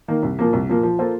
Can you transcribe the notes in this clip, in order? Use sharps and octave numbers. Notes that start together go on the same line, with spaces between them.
D#3 A#3
C2
A#2 F3 A#3
C2
A#2 F3 A#3
F3
A#3 F4 A4 C5